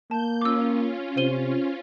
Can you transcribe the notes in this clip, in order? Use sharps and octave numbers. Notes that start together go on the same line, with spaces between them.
A#3 A5 G6
C#4 F4 D6 E6
C3 C5 D#7 G7